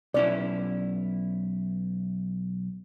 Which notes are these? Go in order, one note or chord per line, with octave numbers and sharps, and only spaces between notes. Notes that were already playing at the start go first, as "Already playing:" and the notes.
B1 C#4 E4 D5